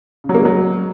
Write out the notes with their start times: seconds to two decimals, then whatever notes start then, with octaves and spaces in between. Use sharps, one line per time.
0.24 C#3
0.29 F#3
0.35 A#3
0.40 G#3
0.45 F#3